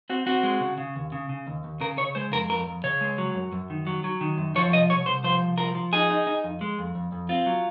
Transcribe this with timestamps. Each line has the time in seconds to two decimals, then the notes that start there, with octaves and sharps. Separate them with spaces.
0.10 C4 F#4
0.26 C4 F#4
0.43 G#3
0.60 C#3
0.78 C#3
0.96 D#2
1.12 C#3
1.29 C#3
1.47 D#2
1.64 D#2
1.80 C#3 A#4
1.98 C#3 C#5
2.15 G#3 C5
2.32 F2 A#4
2.49 F2 A#4
2.67 F2
2.84 C#3 C#5
3.01 G#3
3.18 F#3
3.35 F#2
3.53 F#2
3.70 D#3
3.87 F#3
4.04 F#3
4.21 D#3
4.38 F#2
4.55 F3 C#5
4.72 C2 D#5
4.90 C2 C#5
5.06 C2 C5
5.24 F3 C5
5.41 C2
5.58 F3 A#4
5.75 F3
5.93 D#4 G#4
6.10 D#4
6.27 D#4
6.44 F2
6.61 G#3
6.79 F2
6.95 F2
7.12 F2
7.29 C4 F4
7.46 F#3